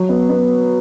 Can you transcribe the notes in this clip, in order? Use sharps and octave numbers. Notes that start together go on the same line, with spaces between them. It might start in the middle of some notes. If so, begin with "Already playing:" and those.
Already playing: F#3
B3
B3